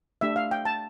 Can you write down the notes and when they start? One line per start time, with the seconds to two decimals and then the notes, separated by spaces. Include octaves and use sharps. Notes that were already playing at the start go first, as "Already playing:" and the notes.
0.21 A3 D4 G4 E5
0.36 F5
0.51 G5
0.65 A5